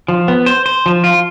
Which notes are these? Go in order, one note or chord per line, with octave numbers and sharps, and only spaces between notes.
F3
B3
C5
C5
F3
F4